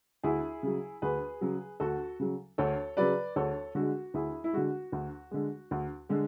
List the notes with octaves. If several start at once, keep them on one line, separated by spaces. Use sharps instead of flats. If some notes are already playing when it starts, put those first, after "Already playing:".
D2 E4 G#4
C#3 F#3
D2 G#4 B4
C#3 F#3
D2 F#4 A4
C#3 F#3
D2 A4 C#5
C#3 F#3 B4 D5
D2 A4 C#5
D3 G#3 F#4
D2 E4 G#4
E4
D3 G#3 F#4
D2
D3 G#3
D2
D3 G#3